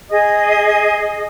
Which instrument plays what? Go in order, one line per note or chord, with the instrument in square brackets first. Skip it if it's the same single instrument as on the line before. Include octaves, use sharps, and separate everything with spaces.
[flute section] G#4 D#5 D#6